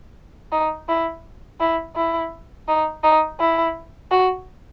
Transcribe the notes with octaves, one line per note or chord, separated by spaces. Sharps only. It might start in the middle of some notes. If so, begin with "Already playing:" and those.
D#4
E4
E4
E4
D#4
D#4
E4
F#4